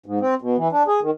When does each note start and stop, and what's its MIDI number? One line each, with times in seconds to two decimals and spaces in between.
0.06 0.19 44
0.21 0.35 60
0.42 0.56 47
0.57 0.68 52
0.72 0.83 62
0.88 1.00 68
1.02 1.11 51